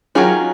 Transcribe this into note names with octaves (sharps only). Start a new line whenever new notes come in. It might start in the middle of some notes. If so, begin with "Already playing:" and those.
D#3 F#3 C#4 F4 G#4